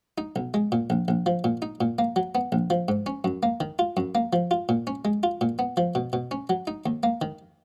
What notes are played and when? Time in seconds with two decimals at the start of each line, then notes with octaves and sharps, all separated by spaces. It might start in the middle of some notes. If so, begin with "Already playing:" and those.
0.18 D#4
0.36 B1
0.54 G#3
0.72 A#2
0.90 A#1
1.08 A#1
1.26 F3
1.44 A#2
1.62 D#4
1.81 A#2
1.99 A#3
2.16 F#3
2.35 B3
2.52 A#1
2.70 F3
2.88 G#2
3.06 C#4
3.24 F#2
3.43 A#3
3.60 D#3
3.79 F4
3.97 F#2
4.15 A#3
4.33 F3
4.51 F4
4.69 A#2
4.87 C#4
5.05 G#3
5.23 F4
5.41 A#2
5.59 B3
5.77 F3
5.95 B2
6.13 B2
6.31 C#4
6.50 F#3
6.67 D#4
6.86 D#2
7.03 A#3
7.22 D#3